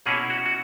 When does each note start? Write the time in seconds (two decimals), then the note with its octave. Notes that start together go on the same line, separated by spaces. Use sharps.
0.06 B2 A#3 C#4 E4 G#4
0.30 F#4
0.46 F#4